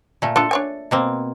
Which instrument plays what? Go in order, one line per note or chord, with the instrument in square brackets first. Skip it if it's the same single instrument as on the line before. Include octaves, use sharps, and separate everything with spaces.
[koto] A#2 A3
[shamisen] D4 F4 [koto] A4
[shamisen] D4 C#5 G#5
[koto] B2 A#3 C4